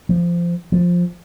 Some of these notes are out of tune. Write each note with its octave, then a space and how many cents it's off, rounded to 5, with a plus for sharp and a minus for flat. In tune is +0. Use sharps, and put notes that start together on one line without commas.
F3 -20
F3 +10